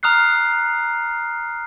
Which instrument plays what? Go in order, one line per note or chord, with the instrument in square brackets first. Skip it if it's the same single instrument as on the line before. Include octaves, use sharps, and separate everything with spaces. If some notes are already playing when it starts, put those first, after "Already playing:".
[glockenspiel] A#5 D#6 F6 F#6 C7